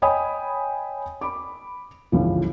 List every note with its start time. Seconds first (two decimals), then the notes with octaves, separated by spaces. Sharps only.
0.02 C#5 D#5 G5 G#5 B5 D#6
1.21 B5 D6
2.12 G1 C#2 E3 F3